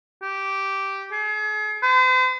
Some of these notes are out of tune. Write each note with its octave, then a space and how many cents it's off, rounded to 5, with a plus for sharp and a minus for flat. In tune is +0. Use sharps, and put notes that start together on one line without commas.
G4 -10
G#4 +40
C5 -40